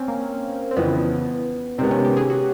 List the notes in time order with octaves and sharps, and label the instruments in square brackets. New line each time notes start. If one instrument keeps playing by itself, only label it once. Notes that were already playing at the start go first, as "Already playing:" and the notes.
Already playing: [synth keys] C4 C#4
A#3
C4
[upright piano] F2 C#3 E3 [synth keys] B3
[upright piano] C3 D#3 G#3 B3 [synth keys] C4
[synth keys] C#4
G4
G#4
F#4